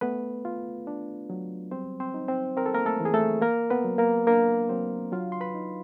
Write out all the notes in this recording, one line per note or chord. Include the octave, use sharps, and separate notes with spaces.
A3 B3 B4
F4
D4
F#3
G3 C4 C5
C4 C5
D#4
C4 C5
C4 A#4
A4
A#3 A#4
A3 A4
E3
G#4
A3 A4
A#3 A#4
B3 B4
F#3
A#3 A#4
A#3 D4 A#4
F#3 C4 C5
F#3 F4 F5
C6
B4 B5
D#4